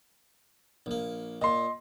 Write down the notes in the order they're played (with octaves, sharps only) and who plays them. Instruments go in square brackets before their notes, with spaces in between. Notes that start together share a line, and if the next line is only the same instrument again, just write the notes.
[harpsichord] A#1 A#3
[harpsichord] A#2 [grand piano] D#5 C6